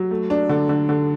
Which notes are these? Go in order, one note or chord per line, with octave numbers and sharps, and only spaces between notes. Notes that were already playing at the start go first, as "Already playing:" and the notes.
Already playing: F#3
A3
D4
D3
D3
D3